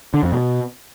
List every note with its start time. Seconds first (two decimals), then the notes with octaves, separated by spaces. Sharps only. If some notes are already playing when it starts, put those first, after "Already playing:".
0.14 D3
0.23 F2
0.32 B2